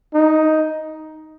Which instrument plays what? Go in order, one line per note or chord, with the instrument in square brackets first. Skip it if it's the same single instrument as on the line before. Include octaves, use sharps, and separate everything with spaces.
[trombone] D#4